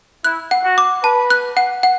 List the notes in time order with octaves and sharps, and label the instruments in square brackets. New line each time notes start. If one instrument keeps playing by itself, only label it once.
[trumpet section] E4 [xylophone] F#6
[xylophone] F#5
[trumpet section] F#4
[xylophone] D6
[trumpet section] B4 [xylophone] A5
[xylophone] F#6
F#5
F#5